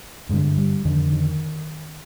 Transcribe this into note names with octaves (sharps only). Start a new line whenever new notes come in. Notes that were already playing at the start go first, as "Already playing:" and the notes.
G2 D3 G#3
G3
F2 D3 D#3
D#3